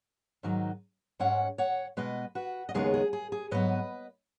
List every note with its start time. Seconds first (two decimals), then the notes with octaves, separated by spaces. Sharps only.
0.43 G#2 D#3 F#3 D#4
1.20 G#2 G#3 C#4 C#5 F#5
1.58 C#5 F#5
1.97 B2 G#3 B3 B4 D#5
2.35 F#4 B4
2.69 D#5
2.74 D#2 C#3 G#3 B3 D#4 G#4 C#5
2.94 G#4
3.13 G#4
3.32 G#4
3.51 G#2 F#3 B3 B4 D#5